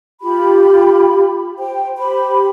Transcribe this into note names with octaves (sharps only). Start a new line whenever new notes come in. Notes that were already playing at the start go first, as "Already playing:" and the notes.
F4 G4 B5
C5 G5
G4 C5 B5